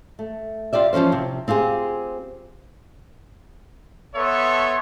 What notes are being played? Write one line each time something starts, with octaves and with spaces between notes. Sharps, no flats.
A3
F4 G4 D5 E5
E3 F3 A#3 C#4 C5
C3
C4 F4 G4 G#4
B3 A4 C#5 E5 C6 C#6